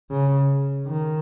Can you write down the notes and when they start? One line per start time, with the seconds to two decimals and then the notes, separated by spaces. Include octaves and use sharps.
0.11 C#3
0.87 D#3